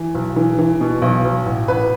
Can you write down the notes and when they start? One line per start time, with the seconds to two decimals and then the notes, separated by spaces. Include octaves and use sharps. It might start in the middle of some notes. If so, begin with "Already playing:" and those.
Already playing: E3
0.15 B1
0.36 E3
0.59 E3
0.81 B2
1.02 B1
1.25 B1
1.46 A1
1.68 A1 B4